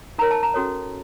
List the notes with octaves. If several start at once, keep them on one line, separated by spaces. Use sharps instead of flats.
D#4 A#4 C#5 A#5
A5
A#5
C#4 F#4 A4 C#5